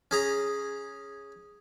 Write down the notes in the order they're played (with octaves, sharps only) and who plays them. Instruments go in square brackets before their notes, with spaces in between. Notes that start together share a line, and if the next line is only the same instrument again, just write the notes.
[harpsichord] C#4 G#4 A#5